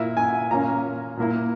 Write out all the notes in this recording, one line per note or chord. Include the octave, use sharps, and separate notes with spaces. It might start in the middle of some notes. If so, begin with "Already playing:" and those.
Already playing: A#2 A#3 E4 E5
G#5
A#2 A#3 C#4 A#5
A#2 A#3 E4